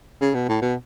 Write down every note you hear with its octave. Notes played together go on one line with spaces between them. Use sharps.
C#3
B2
A2
B2